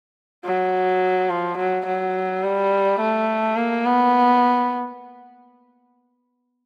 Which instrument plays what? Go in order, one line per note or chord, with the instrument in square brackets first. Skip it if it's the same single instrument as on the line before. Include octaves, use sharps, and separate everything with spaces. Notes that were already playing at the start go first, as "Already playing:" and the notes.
[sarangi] F#3
F3
F#3
F#3
G3
A3
A#3
B3